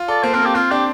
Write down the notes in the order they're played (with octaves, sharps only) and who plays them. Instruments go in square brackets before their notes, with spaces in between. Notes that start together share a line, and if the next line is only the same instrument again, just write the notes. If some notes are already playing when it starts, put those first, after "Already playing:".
Already playing: [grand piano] F4
[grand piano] A4 [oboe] D5
[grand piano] A#3 [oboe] C5
[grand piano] C4 [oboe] A#4
[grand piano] A#3 [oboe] G4
[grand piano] C4 [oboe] F4
[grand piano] D4 [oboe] G4